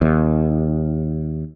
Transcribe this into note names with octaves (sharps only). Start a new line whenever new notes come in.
D#2